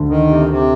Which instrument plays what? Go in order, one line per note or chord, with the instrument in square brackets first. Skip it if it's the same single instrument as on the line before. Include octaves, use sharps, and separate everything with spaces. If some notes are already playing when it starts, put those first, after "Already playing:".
Already playing: [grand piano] D2 D3
[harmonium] D#3
C3
C3